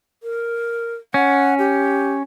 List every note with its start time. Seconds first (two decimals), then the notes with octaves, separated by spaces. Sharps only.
0.23 A#4
1.14 C#4 F#5
1.59 G4